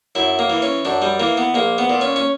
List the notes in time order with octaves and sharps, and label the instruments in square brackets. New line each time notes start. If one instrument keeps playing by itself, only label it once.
[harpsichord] F#2 E4
A#3
E3
C#4
F#2 D4
G3
E3 A#3
B3
A#1 A#3
B3
A#2
C#4
C#4